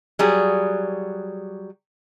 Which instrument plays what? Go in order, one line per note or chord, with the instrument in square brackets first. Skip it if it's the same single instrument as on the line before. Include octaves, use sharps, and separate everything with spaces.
[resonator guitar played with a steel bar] F#3 G3 G#4